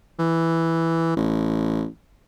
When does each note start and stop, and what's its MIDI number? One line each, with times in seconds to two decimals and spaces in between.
0.19 1.13 52
1.17 1.86 33